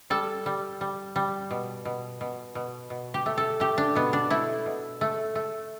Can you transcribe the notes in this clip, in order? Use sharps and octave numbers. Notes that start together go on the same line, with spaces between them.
G3 A4
G3
G3
G3
B2
B2
B2
B2
B2
G4
A3
A4
A3 G4
D4
B2 B3
D4
A3 E4
B2
A3
A3